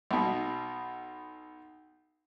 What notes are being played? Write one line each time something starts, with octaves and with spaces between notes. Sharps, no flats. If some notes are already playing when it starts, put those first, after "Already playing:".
B1 B2